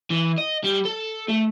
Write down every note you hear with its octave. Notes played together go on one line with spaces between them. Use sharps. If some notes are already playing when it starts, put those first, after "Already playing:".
E3
D#5
G3
A4
A3